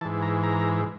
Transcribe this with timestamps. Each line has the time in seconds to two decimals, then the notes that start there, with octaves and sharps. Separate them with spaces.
0.01 G#2 E3 A5
0.22 A#5
0.43 A#5